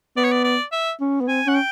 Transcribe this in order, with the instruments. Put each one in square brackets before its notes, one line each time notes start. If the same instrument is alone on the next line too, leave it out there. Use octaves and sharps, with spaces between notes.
[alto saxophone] B3 [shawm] D5
[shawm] C#5
D5
D5
E5
[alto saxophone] C#4
B3
[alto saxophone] C4 [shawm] G#5
[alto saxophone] C#4 [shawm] F#5
[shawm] G5